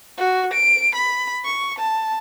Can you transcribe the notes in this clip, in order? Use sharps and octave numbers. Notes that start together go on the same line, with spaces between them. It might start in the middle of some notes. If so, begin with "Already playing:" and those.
F#4
D7
B5
C#6
A5